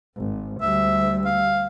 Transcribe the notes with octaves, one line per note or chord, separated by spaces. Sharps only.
G#1
D2 G3 E5
F5